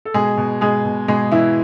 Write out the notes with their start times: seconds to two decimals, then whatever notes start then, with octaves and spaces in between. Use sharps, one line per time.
0.05 A4
0.14 B2 G#3 G#4
0.38 B2
0.61 B2 G#3 G#4
0.85 B2
1.08 B2 G#3 G#4
1.31 B2 E3 E4